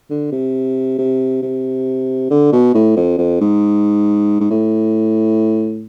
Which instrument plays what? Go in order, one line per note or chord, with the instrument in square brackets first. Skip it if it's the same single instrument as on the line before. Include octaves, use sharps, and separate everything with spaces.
[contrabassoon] D3
C3
C3
C3
D3
B2
A2
F2
F2
G#2
G#2
A2